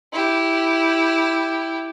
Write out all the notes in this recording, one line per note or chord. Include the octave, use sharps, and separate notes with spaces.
E4 G4